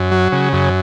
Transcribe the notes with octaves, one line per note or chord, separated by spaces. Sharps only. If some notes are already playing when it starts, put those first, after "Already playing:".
Already playing: F#2
F#3
C#3
F#2